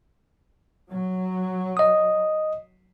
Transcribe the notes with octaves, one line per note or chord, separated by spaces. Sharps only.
F#3
D#5 D#6